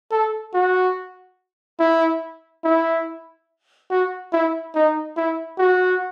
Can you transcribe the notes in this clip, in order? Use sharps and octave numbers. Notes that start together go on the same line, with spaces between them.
A4
F#4
E4
E4
F#4
E4
D#4
E4
F#4